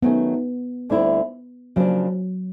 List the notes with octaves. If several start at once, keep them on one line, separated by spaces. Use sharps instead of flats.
D#3 F#3 A3 B3 C#4
D2 D3 G3 C4 E4
C#3 F3 F#3 A#3 D4